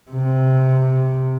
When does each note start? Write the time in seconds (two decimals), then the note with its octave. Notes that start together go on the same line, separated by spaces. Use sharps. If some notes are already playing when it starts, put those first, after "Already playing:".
0.11 C3